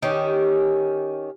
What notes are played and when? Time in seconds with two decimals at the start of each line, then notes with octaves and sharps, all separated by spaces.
0.02 D#3 C#4 G4